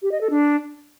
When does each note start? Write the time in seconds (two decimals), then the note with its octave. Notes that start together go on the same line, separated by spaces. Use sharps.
0.02 G4
0.12 D#5
0.21 A4
0.30 D4